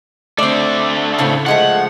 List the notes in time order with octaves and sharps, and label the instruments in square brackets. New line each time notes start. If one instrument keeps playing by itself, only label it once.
[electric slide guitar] D3 A3 [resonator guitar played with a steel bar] C4 D5
[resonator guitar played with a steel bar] A2 C#3 C4
[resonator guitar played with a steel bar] F3 G#3 A3 [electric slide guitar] F#5